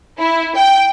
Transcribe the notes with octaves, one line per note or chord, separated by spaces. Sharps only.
E4
G5